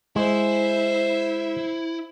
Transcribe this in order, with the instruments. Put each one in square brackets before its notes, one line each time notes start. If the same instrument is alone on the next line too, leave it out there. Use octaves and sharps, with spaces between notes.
[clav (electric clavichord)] G#3 [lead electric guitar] E4 [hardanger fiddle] C5 E5